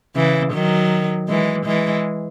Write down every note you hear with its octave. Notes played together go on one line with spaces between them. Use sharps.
C#3 E3
D#3 F#3
E3 G#3
E3 G#3